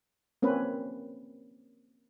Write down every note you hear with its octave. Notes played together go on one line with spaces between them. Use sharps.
A#3 C4 C#4 B4